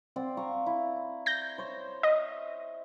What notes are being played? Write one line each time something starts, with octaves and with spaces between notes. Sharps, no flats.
C4 D5 F#5
F5 A#5 C#6
E4
G6 A#6
C5 C#5
D#5